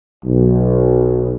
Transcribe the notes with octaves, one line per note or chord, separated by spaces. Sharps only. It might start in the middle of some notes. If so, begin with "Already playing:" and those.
B1